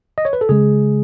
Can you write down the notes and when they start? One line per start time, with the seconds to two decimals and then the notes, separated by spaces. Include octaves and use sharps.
0.18 D#5
0.25 C#5
0.33 B4
0.41 A4
0.49 C#3 G#3 G#4